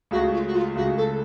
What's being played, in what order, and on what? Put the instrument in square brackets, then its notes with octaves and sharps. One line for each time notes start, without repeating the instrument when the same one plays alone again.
[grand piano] C#2 C#3 A3 [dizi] F#4
[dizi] F4
F#4
F4
[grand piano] C#2 C#3 A3 [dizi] F#4
[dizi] A4